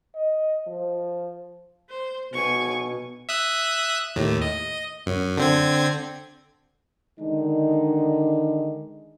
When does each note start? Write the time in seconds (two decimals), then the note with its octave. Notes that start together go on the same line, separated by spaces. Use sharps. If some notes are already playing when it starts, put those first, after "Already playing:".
0.15 D#5
0.67 F3
1.90 C5
2.33 B2 G#5 C#6
3.29 E5 D#6 F#6
4.16 D#2 A2
4.42 D#5
5.06 F#2
5.38 D3 C4 G#6
7.20 D3 D#3 G#3 D4 D#4